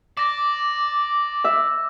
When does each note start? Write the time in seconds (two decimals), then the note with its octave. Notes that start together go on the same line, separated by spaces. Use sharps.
0.17 D5 D6 A#6
1.44 E5